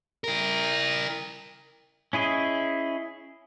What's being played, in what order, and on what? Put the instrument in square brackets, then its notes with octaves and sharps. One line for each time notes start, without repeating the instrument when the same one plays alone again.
[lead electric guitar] E4 A#4
[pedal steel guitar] C#4 E4 G#4 D#5